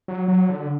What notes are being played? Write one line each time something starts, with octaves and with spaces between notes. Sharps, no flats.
F#3
F#3
D3